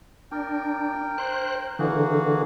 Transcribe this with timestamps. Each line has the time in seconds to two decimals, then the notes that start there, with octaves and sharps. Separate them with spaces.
0.32 D4 A#4 G5
1.18 C5 F#6
1.79 D3 E3 A#3 F#4 G#4